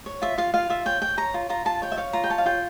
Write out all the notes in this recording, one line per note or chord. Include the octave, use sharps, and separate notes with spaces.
C#5
F4 E5
F4 F5
F4 F5
F4 E5
C#5 G5
C#5 G5
C#5 A#5
F4
F4 A#5
F4 A5
C#5 G5
E5
C#5 F5
F4 A#5
G5
C#5 A5
F5
F4 G5